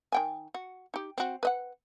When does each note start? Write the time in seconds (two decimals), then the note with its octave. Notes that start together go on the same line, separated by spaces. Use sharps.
0.12 D#3 G5 G#5
0.54 F#4
0.94 D#4 G4
1.18 C4 F#4
1.43 B4 D#5 F#5